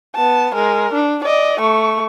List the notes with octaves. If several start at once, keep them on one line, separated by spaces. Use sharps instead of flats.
B3 A5
G#3 A#4
D4
D5 D#5
A3 C#6